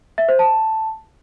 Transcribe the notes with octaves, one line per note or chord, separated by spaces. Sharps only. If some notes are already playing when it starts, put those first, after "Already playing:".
E5
C5
A5